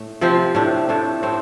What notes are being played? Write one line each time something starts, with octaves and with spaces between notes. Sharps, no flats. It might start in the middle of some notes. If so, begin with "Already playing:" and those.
Already playing: A2 A3
C3 F3 C4 G4
A2 A3 D4
A2 A3 D4
A2 A3 C4